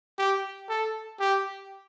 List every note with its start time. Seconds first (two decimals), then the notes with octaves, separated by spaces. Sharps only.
0.18 G4
0.69 A4
1.20 G4